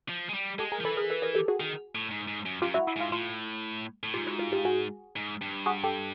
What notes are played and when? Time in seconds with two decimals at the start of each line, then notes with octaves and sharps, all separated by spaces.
0.09 F3
0.29 G#3
0.34 G3
0.59 G#3 G4 A4
0.72 G#4 A#4
0.81 F3
0.85 E3 A4 B4
0.97 G#4 A#4
1.10 A4 B4
1.22 G#4 A#4
1.35 G4 A4
1.48 F#4 G#4
1.60 D#3
1.95 A2
2.11 G#2
2.28 G#2
2.46 F#2
2.62 F#2 F4 G4
2.74 E4 F#4
2.87 E4
2.96 G#2 F4
3.12 A2 F4
4.03 A2
4.14 G#2 F4 G4
4.27 E4 F#4
4.39 F4
4.52 F4 G4
4.65 F#4 G#4
5.16 G#2
5.42 G2
5.66 F#4 G#4
5.84 G4 A4